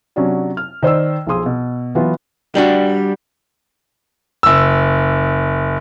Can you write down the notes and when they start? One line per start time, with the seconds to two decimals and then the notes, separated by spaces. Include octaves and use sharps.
0.16 C3 F#3 C#4 D4 F#4
0.57 F6
0.83 D#3 C5 D5 E6
1.27 B1 F3 G#4 C6 D#6
1.46 B2
1.95 E3 F#3 B3 F4
2.55 G3 D4 F#4
4.43 F#1 E6